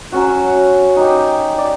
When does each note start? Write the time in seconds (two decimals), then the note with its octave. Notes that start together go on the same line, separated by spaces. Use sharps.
0.12 F#3 C#4 F#4
0.96 D#4 G4
1.58 D5